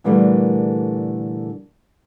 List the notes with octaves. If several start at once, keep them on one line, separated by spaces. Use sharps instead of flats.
A#2 D3 E3 G3 A3 A#3